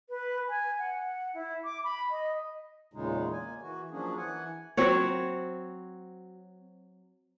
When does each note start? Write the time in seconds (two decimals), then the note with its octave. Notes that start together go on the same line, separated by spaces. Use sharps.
0.09 B4
0.48 G#5
0.78 F#5
1.34 E4
1.64 D6
1.84 B5
2.10 D#5
2.94 E2 A#2 C#3 G#3 D#4
3.32 A#3 G#5
3.62 E3 F#4
3.91 F3 F#3 A#3 C#4 D4 G#4
4.18 E3 F#5 G#5
4.77 F#3 C4 F#4 C#5